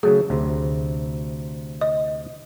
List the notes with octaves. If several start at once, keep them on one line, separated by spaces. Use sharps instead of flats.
C#3 F#3 A3 G#4
D2 C3
D#5